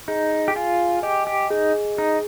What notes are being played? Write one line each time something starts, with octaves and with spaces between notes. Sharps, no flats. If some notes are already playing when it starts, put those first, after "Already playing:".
D#4 G#4
G4
F4 G#5
G4 D#5
G4
D#4 G#4
D#4 G#4